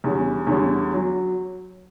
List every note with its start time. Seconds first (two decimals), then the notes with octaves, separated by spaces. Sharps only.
0.04 E2 D3 G3 C#4
0.47 E2 D3 G3 C#4
0.93 F#3